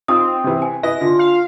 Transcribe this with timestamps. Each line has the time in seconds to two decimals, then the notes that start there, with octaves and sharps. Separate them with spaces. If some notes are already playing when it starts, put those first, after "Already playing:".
0.08 C4 D#4 F4 D#6
0.44 C3 E3
0.62 G#5
0.83 E4 B4 D#5 A#6
1.01 D3 F4
1.19 F5